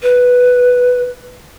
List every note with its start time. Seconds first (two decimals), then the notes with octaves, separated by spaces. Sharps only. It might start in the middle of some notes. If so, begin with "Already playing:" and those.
0.03 B4